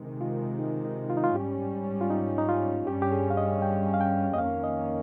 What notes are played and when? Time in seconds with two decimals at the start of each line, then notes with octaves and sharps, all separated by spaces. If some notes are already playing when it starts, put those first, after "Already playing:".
Already playing: C3 D#3 G#3
0.21 F4
0.59 D#4
0.85 D#4
1.10 F4
1.17 D#4
1.24 F4
1.35 G#2 G3 C#4 G4
2.01 F4
2.10 D#4
2.38 D#4
2.49 F4
2.87 G2 G3 C#4 G4
3.02 G4
3.12 G#4
3.30 F5
3.37 D#5
3.62 G5
3.94 F5
4.01 G5
4.33 D#5
4.38 F2 D#3 A#3 C#4 F5
4.64 D#5